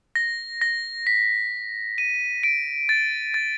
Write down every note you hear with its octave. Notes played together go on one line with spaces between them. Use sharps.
A#6
A#6
B6
D#7
D7
A6
A6